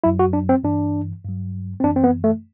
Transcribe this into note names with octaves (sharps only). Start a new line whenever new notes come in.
F#2 F#3 E4
F#4
D4
C4
G2 E3 D4
G2 F#3
C4
F#2 E3 D4
C4
B3
A3